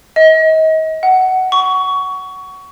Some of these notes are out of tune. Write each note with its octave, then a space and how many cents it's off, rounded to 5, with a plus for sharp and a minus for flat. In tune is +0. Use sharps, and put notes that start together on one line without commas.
D#5 +35
F#5 +15
C#6 +20